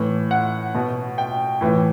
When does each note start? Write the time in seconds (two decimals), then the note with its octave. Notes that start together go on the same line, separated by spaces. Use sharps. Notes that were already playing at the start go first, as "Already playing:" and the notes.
Already playing: A2 E3
0.31 F#5
0.75 B2
1.18 G5
1.61 A2 E3